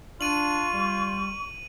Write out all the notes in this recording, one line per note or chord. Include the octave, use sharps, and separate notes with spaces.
D4 F4 C#6 D#7 F#7
G3